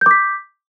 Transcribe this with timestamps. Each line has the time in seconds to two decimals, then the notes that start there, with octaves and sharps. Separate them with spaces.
0.01 G6
0.06 D6
0.11 B6